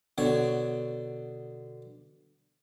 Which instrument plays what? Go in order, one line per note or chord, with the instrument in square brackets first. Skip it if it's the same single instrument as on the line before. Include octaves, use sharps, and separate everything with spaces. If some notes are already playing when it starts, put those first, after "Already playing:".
[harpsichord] B2 D3 C#5